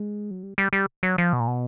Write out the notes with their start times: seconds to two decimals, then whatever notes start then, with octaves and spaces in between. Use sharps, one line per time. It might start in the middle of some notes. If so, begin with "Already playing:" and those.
Already playing: G#3
0.31 F#3
0.43 G3
0.58 G3
0.73 G3
1.03 F#3
1.18 F3
1.33 B2
1.40 A#2
1.47 B2